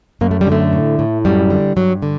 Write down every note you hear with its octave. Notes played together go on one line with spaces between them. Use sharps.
F#2 A#3
A3
G3
D3
A3
A2
A2
F#2 G3
D3
G2 F#3
D3